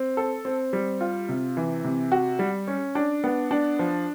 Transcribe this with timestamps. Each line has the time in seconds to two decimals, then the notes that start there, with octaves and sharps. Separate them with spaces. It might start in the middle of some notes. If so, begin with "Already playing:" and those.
Already playing: C4
0.17 A4
0.45 C4
0.73 G3
1.01 F4
1.29 C3
1.57 E3
1.84 C3
2.12 F#4
2.39 G3
2.68 C#4
2.95 D4
3.24 B3
3.51 D4
3.79 F3